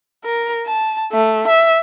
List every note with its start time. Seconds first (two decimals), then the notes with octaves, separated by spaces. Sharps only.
0.24 A#4
0.67 A5
1.12 A3
1.48 E5